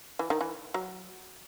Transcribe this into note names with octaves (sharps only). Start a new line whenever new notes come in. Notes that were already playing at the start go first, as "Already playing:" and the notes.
E3
D#3
E3
F#3